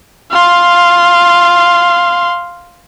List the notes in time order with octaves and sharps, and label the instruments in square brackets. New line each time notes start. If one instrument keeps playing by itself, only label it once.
[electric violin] F5 C6